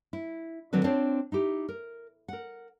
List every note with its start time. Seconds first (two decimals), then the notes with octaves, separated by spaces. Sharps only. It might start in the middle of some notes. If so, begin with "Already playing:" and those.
0.13 E4
0.73 D3 D#3 F#3 C4 D4 B4
0.84 C4 D4 F4 C5 C#5
1.32 D#4 E4 G4
1.69 A#4
2.28 A#4 F#5